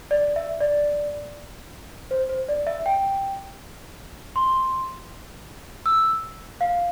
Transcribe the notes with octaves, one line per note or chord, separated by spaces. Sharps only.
D5
E5
D5
C5
C5
D5
E5
G5
C6
E6
F5